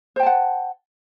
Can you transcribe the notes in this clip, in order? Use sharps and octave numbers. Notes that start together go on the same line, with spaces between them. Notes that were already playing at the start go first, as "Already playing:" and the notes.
C5 F#5 G5 A5